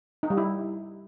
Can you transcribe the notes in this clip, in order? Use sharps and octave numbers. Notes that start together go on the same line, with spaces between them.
D#4
G3
E4